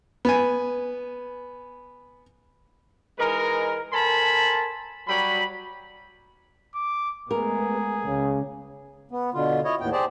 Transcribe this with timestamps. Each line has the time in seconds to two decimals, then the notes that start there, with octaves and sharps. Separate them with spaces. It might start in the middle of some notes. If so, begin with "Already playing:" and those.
0.25 B3 G#5
3.19 E3 G#3 D#4 A#4
3.93 A4 A#4 C5 G#5 A5 B5
5.08 F#3 G3 B5
6.75 D6
7.31 G#3 A3 B3 G#4 A#4
8.06 C#2 C#3
9.11 B3
9.34 B2 D3 F4
9.64 E4 C#5 D#5
9.81 D#2 A2 B3 G5
9.92 G4 G#4 C5 D5 A5